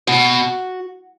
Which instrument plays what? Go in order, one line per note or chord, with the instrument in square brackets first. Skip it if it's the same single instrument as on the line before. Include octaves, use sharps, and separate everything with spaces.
[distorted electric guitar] B2 [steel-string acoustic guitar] F#4